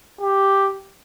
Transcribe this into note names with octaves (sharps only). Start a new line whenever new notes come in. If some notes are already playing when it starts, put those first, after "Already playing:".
G4